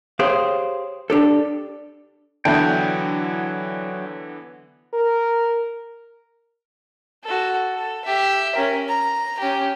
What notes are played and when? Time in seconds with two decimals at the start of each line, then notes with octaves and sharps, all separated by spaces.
0.19 G4 G#4 C5 C#5 F5
1.10 D4 G4 A4
2.45 D3 E3 F#3 B3 D4 E4 G5
4.94 A#4
7.24 F#4 A4
7.74 A4
8.05 G4 E5
8.56 C#4 A#4
8.88 A#5
9.40 C#4 G4